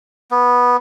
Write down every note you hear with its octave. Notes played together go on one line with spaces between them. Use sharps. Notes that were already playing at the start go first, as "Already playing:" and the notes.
B3